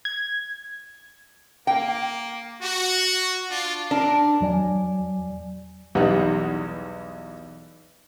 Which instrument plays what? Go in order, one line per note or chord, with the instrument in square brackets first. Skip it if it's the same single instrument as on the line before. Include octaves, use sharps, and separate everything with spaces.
[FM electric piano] G#6
[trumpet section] A#3 [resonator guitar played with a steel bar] G5
[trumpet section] F#4
D4 F4
[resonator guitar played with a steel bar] D4 [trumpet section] A#4
[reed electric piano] E2 F#3 D5 G#5
[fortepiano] B1 E2 G3 B3 D#4 F#5